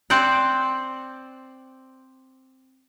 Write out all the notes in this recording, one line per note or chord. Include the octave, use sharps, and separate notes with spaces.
C4 C5 D5 F#5